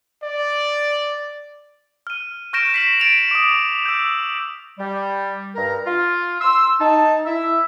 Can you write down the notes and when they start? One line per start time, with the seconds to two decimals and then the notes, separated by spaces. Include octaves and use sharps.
0.24 D5
2.07 F6 D#7
2.53 C#6 F6 G6 A#6 D7 E7
2.73 C#6 B6 C7 E7 F#7
3.00 A6 D7 F7
3.31 D6 D#6
3.86 E6 G6
4.79 G3
5.55 G2 A#4 A#5
5.85 F4
6.41 C6 E6
6.80 D#4 A5
7.26 E4 E5